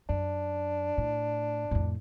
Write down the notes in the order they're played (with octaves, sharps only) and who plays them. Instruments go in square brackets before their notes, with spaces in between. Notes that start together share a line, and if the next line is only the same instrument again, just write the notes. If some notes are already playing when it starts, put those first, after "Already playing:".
[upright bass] F#2 [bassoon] D4
[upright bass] A2
F2 A2